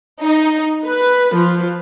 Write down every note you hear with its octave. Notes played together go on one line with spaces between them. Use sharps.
D#4
B4
F3